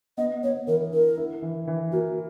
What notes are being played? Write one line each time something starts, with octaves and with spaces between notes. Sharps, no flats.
B3 D#5
B3 C#5
E3 A#4
E4 A#4
E4
E3
E3
A#3 F#4